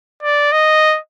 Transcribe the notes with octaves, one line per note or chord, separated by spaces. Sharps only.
D5
D#5